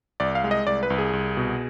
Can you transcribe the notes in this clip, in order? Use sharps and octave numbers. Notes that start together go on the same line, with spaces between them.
C2 D5
F5
G#3
D#5
C2 D5
B4
C2
G#4
C2
B2